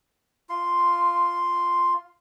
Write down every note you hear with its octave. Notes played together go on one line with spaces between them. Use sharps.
F4 C6